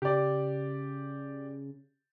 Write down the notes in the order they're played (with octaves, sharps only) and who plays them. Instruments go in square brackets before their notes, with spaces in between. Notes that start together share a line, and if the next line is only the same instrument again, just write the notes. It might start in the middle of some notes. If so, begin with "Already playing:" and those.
[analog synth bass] C#3 [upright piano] G4 D5